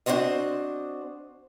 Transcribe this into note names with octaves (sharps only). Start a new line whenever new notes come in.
C4 D4 F#4 C5 D#5